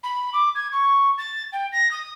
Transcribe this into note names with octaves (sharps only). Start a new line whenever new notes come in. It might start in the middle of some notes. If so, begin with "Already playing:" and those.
B5
D6
G#6
C#6
A6
G5
A#6
D#6